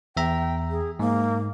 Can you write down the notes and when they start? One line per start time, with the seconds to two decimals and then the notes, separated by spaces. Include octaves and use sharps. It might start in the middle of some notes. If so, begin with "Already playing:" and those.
0.17 E2 E5 G5 A#5
0.70 G#4
0.99 G#2 A#3